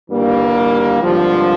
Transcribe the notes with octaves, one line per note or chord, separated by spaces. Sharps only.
G1 G2 E3 G3 A#3
G#1 G2 D3 F3